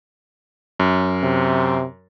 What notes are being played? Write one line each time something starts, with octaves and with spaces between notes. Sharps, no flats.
F#2
C3